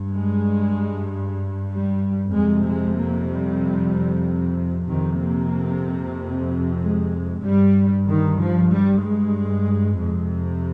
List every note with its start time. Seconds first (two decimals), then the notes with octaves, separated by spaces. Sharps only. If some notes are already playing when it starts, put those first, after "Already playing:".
Already playing: G2
0.10 G#3
1.69 G3
2.33 F2 C3 G#3
2.65 G#3
2.97 A#3
3.29 G3
4.89 F2 C3 D#3
5.21 A#3
6.80 G#3
7.44 G2 G3
8.08 D#3
8.40 F3
8.72 G3
9.03 G#3
10.00 F2 C3